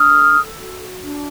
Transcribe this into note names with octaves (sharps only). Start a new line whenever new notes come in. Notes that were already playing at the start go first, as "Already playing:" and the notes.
Already playing: D4 D#6 F6
A4
F#4
D4